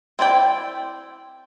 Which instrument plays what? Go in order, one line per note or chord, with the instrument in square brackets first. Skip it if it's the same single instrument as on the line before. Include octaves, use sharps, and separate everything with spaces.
[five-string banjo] C4 E4 D5 G5